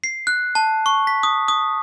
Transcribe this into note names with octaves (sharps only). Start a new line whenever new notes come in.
C7
F#6
A5
C#6
B6
D#6
D#6